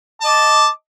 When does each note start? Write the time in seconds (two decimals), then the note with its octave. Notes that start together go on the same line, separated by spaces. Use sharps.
0.21 A5
0.24 D#5
0.27 D6